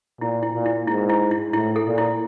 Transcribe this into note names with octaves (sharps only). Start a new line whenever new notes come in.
A#2 E4
E4
A#2
E4
G#2 E4
E4
E4
A2 E4
A4
A#2
E4